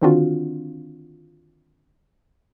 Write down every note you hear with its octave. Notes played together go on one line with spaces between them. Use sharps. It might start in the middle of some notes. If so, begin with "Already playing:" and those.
D3 D#3 C4 D4 F4 F#4